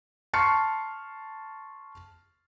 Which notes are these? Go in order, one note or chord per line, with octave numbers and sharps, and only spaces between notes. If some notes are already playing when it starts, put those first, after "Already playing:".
A5 C6 C#6 F6 C7 C#7